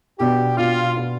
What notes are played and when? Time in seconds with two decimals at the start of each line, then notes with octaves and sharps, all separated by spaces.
0.19 B2 B3 D4 G4
0.57 B2 B3 D4 F4
0.95 B2 B3 D4